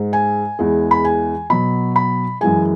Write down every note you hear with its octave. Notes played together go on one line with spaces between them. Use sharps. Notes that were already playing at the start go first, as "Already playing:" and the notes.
Already playing: G#2 G#3
G#5
E2 E3 G#3
B5
G#5
B2 F#3 B5
B5
F#2 E3 G#3 G#5